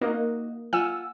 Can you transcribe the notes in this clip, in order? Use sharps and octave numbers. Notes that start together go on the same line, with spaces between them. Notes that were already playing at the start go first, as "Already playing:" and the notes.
A#3 D#4 F#4 D#5
F4 F#5 G#5 E6